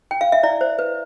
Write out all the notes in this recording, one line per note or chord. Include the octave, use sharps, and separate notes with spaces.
G5
F5
E5
E4 D5
C5
B4